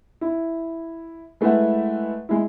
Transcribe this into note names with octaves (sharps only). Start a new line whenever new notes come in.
E4
G#3 A3 E4 B4 E5 F#5
G#3 E4